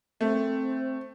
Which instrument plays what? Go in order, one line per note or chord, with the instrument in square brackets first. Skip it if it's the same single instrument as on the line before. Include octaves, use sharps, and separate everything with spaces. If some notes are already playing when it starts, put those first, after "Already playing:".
[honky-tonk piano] A3 [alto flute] C4